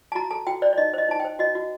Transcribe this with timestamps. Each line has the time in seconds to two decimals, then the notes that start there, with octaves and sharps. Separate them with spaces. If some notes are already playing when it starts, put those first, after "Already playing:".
0.12 A5
0.15 F#4 A#5
0.31 A4 A5
0.47 F#4 G5
0.62 C5 D5
0.73 D5
0.78 D#4 D#5
0.93 C5 D#5
1.09 D#4 A5
1.20 G5
1.25 C5
1.39 F#4 D#5
1.55 F#4